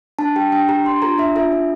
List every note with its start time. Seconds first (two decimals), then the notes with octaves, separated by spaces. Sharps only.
0.19 D4 A5
0.36 G4 G5
0.52 D4 G5
0.69 G4 A#5
0.85 D4 C6
1.02 F4 A4 A#5
1.18 D4 E5
1.36 F4 A4 E5
1.52 D4